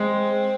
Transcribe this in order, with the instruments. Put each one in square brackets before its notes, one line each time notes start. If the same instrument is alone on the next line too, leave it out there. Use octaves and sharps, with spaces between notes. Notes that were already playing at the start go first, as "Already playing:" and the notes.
Already playing: [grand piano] G#3 [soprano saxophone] C4